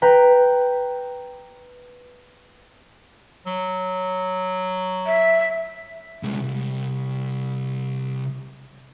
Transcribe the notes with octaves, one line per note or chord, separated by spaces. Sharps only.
B4 G5 A#5
F#3
E5
C2 G#3
C2